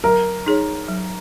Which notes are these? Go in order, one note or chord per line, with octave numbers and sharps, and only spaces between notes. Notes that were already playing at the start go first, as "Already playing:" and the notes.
F#3 A#4
D#4 G#4 C#5
F#3